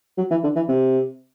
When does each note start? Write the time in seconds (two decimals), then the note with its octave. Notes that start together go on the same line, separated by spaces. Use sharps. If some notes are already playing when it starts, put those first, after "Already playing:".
0.18 F#3
0.31 E3
0.44 D3
0.56 E3
0.69 C3